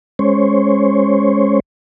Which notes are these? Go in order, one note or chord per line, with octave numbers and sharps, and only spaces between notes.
G#3 C#4 C5 C#5